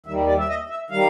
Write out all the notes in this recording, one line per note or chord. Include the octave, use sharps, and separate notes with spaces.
D#2 D#3 G3 E5
D5
E5
D#5
E5
D#3 G3 F5